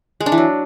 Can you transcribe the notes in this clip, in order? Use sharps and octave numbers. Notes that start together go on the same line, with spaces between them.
G#3
D4
E3
F#3